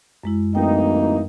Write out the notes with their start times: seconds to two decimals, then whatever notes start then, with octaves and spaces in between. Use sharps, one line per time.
0.23 F#2 G#3 E4
0.55 D1 E3 A#3 D#4 G5